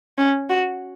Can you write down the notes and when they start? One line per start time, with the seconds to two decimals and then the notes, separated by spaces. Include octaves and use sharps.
0.18 C#4
0.49 F#4